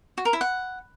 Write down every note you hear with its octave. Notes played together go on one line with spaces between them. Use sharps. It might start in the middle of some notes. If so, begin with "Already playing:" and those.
F#4
A#4
E4
F#5